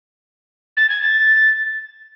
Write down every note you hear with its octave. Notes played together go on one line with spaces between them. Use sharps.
A6
G#6
A6